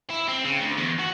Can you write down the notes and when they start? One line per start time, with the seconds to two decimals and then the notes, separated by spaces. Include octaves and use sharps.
0.10 E4
0.28 C4
0.45 C#3
0.60 D2
0.77 E2
0.99 F#4